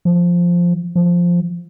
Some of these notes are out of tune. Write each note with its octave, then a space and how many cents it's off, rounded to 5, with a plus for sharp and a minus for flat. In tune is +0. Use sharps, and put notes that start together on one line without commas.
F3 +0
F3 +0